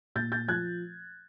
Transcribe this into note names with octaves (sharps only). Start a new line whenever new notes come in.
A#2 G6 A6
G6 A6
F3 F#6 G#6